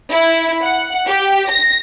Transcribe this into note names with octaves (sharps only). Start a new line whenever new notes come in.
E4
F#5
G4
A#6